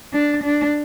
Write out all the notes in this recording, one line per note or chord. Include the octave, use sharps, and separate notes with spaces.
D4
D4